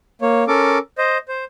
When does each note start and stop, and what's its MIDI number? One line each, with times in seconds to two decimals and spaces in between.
0.22 0.44 58
0.22 0.44 73
0.48 0.78 61
0.48 0.78 69
0.48 0.78 70
0.48 0.78 86
0.98 1.18 72
0.98 1.18 75
1.28 1.44 72